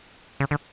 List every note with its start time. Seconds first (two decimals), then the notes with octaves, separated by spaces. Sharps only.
0.40 C#3
0.51 D3